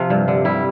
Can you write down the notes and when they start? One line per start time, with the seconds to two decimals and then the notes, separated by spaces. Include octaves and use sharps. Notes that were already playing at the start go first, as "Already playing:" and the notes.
Already playing: C3 F3 F4
0.10 G2
0.28 D3
0.45 G3 E4